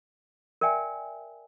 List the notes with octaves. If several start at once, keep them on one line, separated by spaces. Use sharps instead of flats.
A#4 D5 E5 G5 G#5